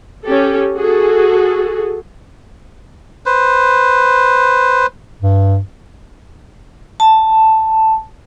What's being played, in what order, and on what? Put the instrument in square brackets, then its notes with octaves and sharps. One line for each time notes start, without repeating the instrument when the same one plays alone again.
[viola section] C#4 G4 A4
F#4 G#4 A4
[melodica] B4 C5
[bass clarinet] G2
[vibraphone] A5